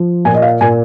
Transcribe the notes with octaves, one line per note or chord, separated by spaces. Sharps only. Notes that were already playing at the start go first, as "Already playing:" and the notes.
Already playing: F3
A#2 G#5
D#5
F5
A#2 G#5